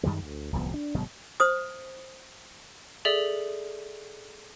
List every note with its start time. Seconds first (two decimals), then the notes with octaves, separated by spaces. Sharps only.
0.03 F#2 D#3 G3 G#3
0.21 D2
0.53 D1 C2 F3 B3
0.74 D4
0.94 G1 B2 F#3 G#3
1.40 C5 D#6
3.05 G#4 A4 D5 E5